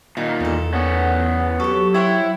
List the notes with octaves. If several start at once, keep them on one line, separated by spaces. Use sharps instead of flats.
A#2 D#3 D#4
E2 D#4 A4
B3 C#4 F#5
F#3 G4 A4 C#6
E4 C5 C#5 F#5 G5